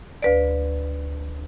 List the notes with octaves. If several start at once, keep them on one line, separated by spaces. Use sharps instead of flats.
D2 B4 D5